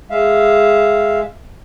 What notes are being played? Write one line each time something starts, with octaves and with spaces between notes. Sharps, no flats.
G#3 E5 F5